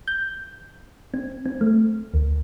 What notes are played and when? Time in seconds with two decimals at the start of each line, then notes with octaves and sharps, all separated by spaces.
0.08 G6
1.14 C4
1.46 C4
1.61 A3
2.14 D2